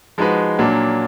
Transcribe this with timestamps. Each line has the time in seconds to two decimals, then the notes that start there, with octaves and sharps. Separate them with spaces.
0.18 F3 G#3 D#4 F#4 B4
0.59 A#2 F#3 A#3 D4